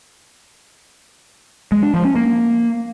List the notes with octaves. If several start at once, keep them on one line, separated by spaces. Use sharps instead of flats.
G#3
D4
F3
C#4
A#3